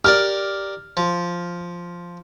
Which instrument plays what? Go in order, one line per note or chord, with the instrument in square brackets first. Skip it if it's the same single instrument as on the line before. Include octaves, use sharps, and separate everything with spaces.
[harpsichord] G4 A#4 D5 [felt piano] F6
[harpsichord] F3